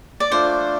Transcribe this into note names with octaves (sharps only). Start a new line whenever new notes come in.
D5
A3 D4 F4 C5